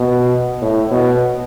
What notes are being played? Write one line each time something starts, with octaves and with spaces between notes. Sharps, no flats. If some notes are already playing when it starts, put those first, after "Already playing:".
Already playing: B2
A2
B2